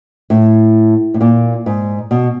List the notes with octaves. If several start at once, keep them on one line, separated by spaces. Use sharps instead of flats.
A2
A2
A#2
G#2
B2